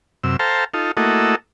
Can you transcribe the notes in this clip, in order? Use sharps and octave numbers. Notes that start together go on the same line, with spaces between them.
F#2 C3 E6
A4 C5 F5 G5 A5 A#5
D#4 F4 A4
A3 A#3 E4 F#4 A4 D#5